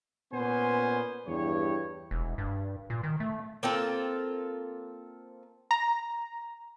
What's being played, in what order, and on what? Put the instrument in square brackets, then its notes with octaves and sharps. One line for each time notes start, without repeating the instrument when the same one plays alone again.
[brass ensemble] A#2 B3 C#4 C5 G#5
E2 G2 G4 C#5
[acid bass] E1
G2
A#2
D#3
A3
[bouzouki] A#3 C4 F4 A4
[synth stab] A#5